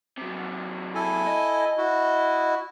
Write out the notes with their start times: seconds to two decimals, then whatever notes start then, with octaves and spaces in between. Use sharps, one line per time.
0.18 C3 F#3
0.95 E4 A4 G#5
1.27 D#5
1.77 E4 F#4